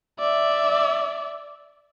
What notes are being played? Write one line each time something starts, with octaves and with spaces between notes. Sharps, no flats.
D5 E5